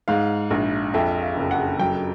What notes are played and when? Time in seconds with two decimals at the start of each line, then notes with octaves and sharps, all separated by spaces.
0.08 G#2 F5
0.51 A#1
0.94 F2 E5
1.22 F5
1.37 F#1
1.51 F#5
1.79 F#3 G5